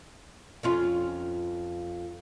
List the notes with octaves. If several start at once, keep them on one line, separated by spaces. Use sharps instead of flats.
F2 C#4 F4